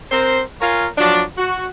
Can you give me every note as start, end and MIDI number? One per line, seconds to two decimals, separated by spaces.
0.12 0.41 60
0.12 0.41 70
0.12 0.41 72
0.60 0.86 65
0.60 0.86 70
0.60 0.86 73
0.60 0.86 77
0.60 0.86 80
0.98 1.22 53
0.98 1.22 54
0.98 1.22 62
1.37 1.67 66